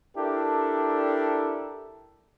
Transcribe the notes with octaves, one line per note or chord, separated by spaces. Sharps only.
D4 E4 G4 A4 A#4